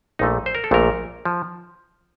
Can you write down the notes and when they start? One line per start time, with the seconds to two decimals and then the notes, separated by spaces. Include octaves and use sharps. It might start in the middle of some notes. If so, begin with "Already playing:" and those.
0.19 A#1 A#2 A3 D#4
0.46 C5
0.55 A#4
0.64 A4
0.71 A#1 A#2 A3 A#4
1.25 F3